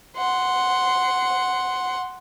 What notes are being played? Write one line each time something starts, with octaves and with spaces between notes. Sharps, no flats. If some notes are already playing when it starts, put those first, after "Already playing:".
F#5 C6